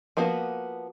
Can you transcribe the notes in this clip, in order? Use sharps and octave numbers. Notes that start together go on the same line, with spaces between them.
F3 A#3 B3 F#4